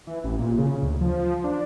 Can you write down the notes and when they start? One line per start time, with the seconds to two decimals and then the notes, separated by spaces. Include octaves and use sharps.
0.07 E3
0.24 A1
0.39 A#2
0.58 C#3
0.83 D2
1.01 F3
1.44 D4